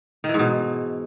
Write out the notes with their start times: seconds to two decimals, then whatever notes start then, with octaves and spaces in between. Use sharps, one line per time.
0.24 D#3
0.29 E3
0.34 G#2
0.39 B2